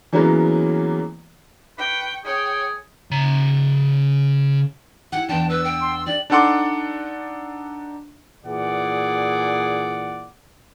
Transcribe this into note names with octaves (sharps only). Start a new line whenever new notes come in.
E3 F#3 G#3 A#3 B3 C#4
B4 G5 C#6
G#4 C#5 G5
C#3 A#5
E4 G4 F#5
E2 B3 D4 G5 A5
B4 E6
G5
C6
D4 G4 D5 F#7
D4 D#4 A4 F#5 C6 D6
A#2 E3 G#4 D5 F#5